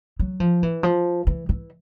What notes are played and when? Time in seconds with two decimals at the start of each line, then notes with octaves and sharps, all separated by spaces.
0.19 F#3
0.40 F3
0.63 E3
0.83 F3
1.27 E3
1.49 E3